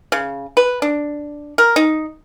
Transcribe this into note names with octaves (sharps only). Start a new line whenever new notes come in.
C#3
B4
D4
A#4
D#4